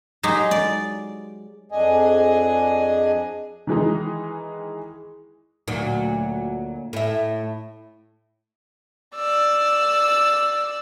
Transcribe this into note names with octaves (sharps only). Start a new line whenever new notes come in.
F#3 G#3 D#4 G4 G#4
D5
F2 D4 G#4 D#5 G#5
D#3 E3 G#3 D#4
D2 A#2 F#3
A2 E5
D5 E6